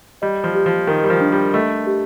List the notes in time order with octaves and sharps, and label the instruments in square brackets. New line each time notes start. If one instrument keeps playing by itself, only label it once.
[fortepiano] G3 [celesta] D#5
[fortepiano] F3
[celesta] G4
[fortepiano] F3
[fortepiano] D#3 [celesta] A#4
[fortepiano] G3
F3
[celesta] D4
[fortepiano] G3
[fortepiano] A3 [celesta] D#5
[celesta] G4